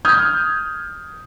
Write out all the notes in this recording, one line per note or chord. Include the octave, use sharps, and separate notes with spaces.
D#6 F6 G6 G#6